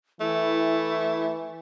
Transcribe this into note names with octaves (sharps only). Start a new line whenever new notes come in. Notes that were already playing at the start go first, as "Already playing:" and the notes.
E3 A3 E4